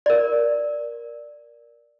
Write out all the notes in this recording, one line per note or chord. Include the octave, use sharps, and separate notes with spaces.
A#4 D5